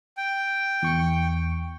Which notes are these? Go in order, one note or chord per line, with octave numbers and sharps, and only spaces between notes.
G5
E2 C#6 C#7